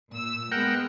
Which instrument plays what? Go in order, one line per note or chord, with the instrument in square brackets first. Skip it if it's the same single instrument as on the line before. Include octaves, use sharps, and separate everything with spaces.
[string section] A#2 E6
[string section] G#3 B3 [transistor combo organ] A#4 F#5 G5